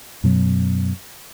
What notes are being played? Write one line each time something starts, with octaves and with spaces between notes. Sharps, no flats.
F#2 B2 F#3